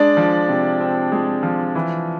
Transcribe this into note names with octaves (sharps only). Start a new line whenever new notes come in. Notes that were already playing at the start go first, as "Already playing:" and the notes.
Already playing: G#3 D4 D5
F3
C3
C4
G#3
F3
E3